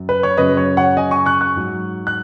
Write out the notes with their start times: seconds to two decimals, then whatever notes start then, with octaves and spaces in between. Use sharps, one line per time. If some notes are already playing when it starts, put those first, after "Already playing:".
Already playing: F#2 F#3
0.09 B4
0.23 C#5
0.37 F#2 C#3 F#3 B4 D#5
0.57 C#5
0.77 C#5 F#5
0.97 D#5 G#5
1.11 G#5 C#6
1.26 C#6 F#6
1.41 C#6 F#6
1.56 G#2 F#3
2.07 F#6